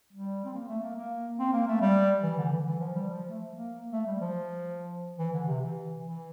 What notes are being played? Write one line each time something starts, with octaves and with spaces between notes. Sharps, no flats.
G3
C4
A#3
A3
A#3
A#3
C4
A#3
A3
G3
E3
D3
E3
D3
E3
F3
G3
F3
A3
A#3
A3
G3
F3
E3
D3
C3
E3
E3